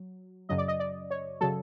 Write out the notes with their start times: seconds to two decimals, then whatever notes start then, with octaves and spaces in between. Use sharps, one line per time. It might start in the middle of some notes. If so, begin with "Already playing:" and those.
Already playing: F#3
0.49 F#2 C#3 F#3 D#5
0.58 D5
0.68 D#5
0.80 D5
1.11 C#5
1.41 C#3 F#3 A4